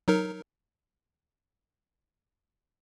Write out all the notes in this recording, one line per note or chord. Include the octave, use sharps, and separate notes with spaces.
F#3 D#4 A#4